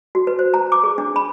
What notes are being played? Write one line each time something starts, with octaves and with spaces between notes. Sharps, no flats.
F#4
B4
C5
A#5
D6
G#4
D4
B5